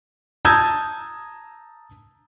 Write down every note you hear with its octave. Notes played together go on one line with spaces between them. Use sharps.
A5 A#5 D#6 E6 G6 G#6